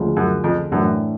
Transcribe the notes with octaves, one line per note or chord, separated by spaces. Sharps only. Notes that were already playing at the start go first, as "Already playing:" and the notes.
Already playing: D2 C#3 F3 G#3
F#2
F2
F#2 A2 E3 A3 D4